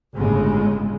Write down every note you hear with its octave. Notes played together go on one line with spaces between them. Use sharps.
G1 A2 C#3 G#3